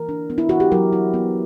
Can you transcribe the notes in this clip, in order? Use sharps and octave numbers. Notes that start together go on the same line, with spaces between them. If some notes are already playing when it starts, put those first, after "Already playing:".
Already playing: E3 A#4
D4
B3
E4
E3 F#4
G4
F#3 A#4
E4
B3